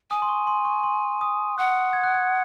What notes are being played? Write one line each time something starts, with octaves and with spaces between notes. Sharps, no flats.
G#5 D#6
C6
C#6
C6
C#6
C6
D#6
F#5 F#6
G#6
F#6
G#6